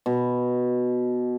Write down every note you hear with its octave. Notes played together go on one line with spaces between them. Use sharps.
B2